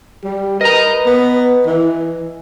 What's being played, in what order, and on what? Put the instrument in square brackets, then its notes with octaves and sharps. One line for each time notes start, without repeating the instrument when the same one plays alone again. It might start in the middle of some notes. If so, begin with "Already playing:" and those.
[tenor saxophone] G3 [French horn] G4
[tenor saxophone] A#4 [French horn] B4 [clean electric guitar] D#5 A#5
[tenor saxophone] B3
E3